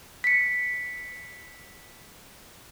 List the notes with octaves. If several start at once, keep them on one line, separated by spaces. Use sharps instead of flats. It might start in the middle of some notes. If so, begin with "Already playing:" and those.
B6 C#7